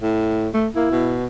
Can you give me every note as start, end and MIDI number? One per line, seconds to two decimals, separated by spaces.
0.01 0.48 45
0.54 0.68 57
0.75 0.90 58
0.75 1.18 64
0.91 1.27 47